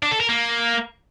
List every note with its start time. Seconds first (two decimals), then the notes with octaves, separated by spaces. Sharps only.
0.03 D4
0.12 A4
0.20 A#4
0.29 A#3